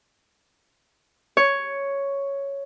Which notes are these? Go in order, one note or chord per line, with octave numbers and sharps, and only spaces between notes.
C#5